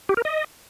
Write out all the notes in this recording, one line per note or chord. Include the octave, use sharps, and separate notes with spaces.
G4
A#4
D#5